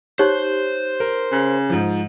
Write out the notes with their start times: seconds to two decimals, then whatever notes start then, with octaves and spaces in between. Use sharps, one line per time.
0.19 D#4 G4 C5 C#5 F#6
1.00 A#4
1.31 C#3
1.70 G#2 F3